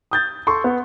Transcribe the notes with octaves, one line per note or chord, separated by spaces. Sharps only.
D#6 G6 A6
A4 C6 C#6
B3